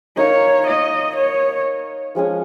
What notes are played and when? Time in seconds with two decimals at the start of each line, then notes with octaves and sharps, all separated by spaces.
0.17 D#4 A#4 C#5 F5
0.67 D#5
1.16 C#5
2.15 F3 G#3 C#4 G#4